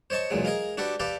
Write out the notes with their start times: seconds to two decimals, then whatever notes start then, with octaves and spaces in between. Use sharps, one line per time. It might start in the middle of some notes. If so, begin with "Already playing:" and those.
0.10 C5 C#5 D#5 A5 C#6
0.30 B1 E2 A#2 F#3 G#3
0.45 G#4 A#4 D#5 F5
0.77 D4 F#4 G4 A4 B4
1.00 G4 A4 B4 D5 F5